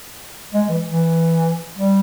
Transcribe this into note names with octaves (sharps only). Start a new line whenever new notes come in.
G#3
E3
E3
G3